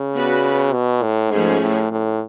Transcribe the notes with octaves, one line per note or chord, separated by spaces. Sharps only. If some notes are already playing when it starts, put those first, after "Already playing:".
Already playing: C#3
B3 F#4 B4 D5
B2
A2
G#2 F3 A3 C#4 G#4
A2
A2